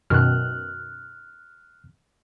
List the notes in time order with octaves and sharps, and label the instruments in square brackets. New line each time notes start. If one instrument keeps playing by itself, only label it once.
[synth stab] F#2 B2 D#3 [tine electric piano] F6 F#6